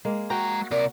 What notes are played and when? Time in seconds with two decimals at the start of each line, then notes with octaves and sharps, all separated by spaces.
0.05 G#3 A#3
0.30 G#3 F#4 G5 A#5
0.71 C3 A#4 D5